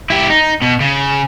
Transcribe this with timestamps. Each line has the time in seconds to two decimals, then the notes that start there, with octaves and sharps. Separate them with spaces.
0.10 E4 G4
0.30 D#4
0.62 B2
0.81 C#3